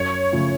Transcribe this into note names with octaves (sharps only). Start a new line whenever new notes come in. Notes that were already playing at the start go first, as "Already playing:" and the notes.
Already playing: F#2 C#5
C#3 F3 A3